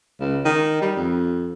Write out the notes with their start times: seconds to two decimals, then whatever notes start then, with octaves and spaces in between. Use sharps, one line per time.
0.20 C#2
0.45 D#3
0.82 G3
0.96 F2